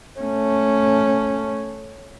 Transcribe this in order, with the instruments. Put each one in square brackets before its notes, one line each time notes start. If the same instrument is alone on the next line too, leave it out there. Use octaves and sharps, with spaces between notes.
[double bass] A3 C#4